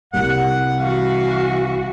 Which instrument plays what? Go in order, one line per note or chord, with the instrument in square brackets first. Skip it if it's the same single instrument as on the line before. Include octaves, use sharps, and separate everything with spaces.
[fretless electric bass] C2 G3 A#3 [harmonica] F#5
[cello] E3 F#4 [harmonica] F5